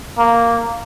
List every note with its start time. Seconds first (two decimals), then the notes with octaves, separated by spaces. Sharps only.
0.19 A#3